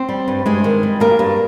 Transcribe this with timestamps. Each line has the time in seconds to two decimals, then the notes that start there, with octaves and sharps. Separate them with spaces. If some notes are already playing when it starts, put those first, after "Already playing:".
Already playing: C4 C5
0.09 G3
0.28 G2
0.46 G2 G#3 G#4
0.64 D#3
0.83 G3
1.00 G2 A#3 A#4
1.19 G2